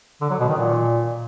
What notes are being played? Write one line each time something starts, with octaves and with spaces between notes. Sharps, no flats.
D3
F#3
B2
D#3
A#2